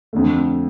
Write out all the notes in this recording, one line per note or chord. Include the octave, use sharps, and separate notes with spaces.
F2 D3 A3